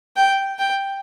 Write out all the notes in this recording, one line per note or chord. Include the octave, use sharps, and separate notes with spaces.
G5
G5